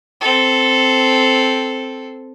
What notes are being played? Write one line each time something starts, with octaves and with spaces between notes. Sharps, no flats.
C4 A4